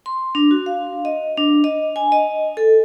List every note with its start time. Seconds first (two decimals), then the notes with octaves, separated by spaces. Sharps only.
0.06 C6
0.35 D4
0.51 F#4
0.66 F5
1.05 D#5
1.37 D4
1.64 D#5
1.96 G#5
2.12 D#5
2.57 A4